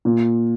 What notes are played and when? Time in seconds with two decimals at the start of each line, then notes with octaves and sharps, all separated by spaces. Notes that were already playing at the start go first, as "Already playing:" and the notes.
0.05 A#2